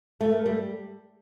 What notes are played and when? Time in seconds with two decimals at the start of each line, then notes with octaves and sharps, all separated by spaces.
0.21 A3 A4
0.33 A#4
0.46 G3 A4